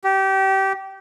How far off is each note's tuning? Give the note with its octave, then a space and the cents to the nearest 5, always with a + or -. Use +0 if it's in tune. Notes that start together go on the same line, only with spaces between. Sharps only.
G4 -25